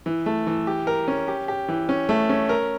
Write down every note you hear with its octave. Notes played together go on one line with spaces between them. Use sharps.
E3
A3
E3
G4
A#4
C#4
G4
G4
E3
C#4
A3
C#4
A#4